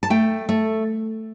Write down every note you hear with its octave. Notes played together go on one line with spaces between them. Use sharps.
A5
A3 G5
A3